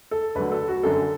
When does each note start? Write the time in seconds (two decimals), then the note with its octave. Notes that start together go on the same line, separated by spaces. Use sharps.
0.11 A4
0.35 D2 D3 F#3 B4
0.52 A4
0.68 F#4
0.83 F#2 D3 F#3 A4